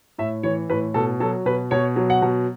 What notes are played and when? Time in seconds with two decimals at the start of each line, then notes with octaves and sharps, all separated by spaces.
0.18 A2 E5
0.43 E3 C#5
0.70 A2 B4
0.94 B2 A4
1.20 F#3 A4
1.46 B2 B4
1.71 B2 C#5
1.96 F#3
2.10 F#5
2.22 B2